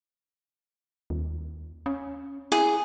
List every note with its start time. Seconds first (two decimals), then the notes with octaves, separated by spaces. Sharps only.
1.10 D#2
1.86 C#4
2.52 E4 G#4